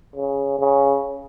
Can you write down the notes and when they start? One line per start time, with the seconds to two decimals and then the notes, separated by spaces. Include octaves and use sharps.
0.16 C#3
0.59 C#3